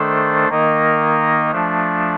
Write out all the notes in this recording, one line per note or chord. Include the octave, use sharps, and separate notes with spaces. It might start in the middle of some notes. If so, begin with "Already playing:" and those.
Already playing: D#3 A3 D4 A4 C5
D#3 A#3 D#4 A#4 D#5
F3 A3 D4